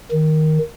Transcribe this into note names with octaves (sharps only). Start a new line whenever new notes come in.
D#3